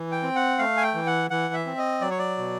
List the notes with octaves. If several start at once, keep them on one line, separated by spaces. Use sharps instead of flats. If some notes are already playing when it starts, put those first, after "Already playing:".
Already playing: E3
G5
C4
F#5
A3 F5
G#5
G5
E3
F#5
E3 F#5
E5
C4
D#5
F#3 D5
C#5
D5
B2